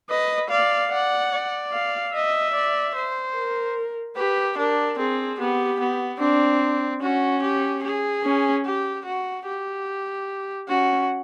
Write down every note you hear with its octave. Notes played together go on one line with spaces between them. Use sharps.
B4 D#5
D5 F5
D5 F#5
D5
F5
D#5 E5
D5
C5
A#4
G4 B4
D4 A#4
C4 G#4
B3 G4
B3
C4 D4
C#4 F#4
G4
G#4
C#4
G4
F#4
G4
C#4 F#4